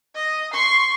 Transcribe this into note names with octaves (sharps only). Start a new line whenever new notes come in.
D#5
C6 C#6